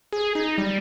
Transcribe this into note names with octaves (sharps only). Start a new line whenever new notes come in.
G#4
D#4
G3